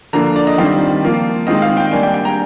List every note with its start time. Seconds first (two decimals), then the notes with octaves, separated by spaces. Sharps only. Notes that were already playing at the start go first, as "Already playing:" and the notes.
0.13 D3 F3 A#3 F4 A#5
0.36 D5
0.47 D#5
0.58 D#3 G3 C4 F4 D5
1.02 F3 A#3 F4
1.47 D#3 G#3 C4 F4 D#5
1.62 F5
1.77 G5
1.91 G3 A#3 D4 G#5
2.03 G5
2.14 G5
2.25 A#5